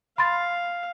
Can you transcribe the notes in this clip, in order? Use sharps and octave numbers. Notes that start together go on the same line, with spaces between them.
F5 B5 C6 A6